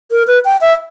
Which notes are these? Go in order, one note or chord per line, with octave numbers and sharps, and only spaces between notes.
A#4
B4
G5
E5